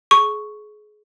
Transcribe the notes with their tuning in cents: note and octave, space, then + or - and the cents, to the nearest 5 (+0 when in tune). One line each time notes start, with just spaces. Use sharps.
G#4 +25 C#6 +0